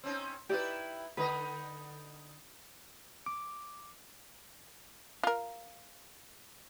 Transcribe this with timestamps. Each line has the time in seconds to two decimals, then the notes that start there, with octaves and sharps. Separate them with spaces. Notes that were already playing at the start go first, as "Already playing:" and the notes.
0.03 C4 C#4 D#4
0.49 D#4 E4 G4 B4 D5
1.17 D3 D#4 B4 D#5
3.26 D6
5.24 F4 A#4